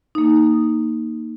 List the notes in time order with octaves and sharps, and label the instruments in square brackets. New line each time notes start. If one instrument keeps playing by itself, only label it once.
[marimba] A#3 D#4